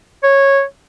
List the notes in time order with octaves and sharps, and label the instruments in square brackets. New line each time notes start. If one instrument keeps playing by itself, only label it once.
[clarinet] C#5